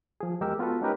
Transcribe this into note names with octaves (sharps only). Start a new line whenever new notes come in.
F3 G#4
E2 G#3 G4 A#4 E6
B3 F4 F#4 A4 B4
G#3 C#4 D#4 G4 A#4 B4